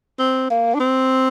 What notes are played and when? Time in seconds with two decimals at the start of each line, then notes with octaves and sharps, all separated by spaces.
0.19 C4
0.51 A#3
0.75 D4
0.80 C4